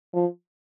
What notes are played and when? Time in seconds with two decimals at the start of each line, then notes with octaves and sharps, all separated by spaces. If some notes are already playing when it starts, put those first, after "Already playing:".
0.14 F3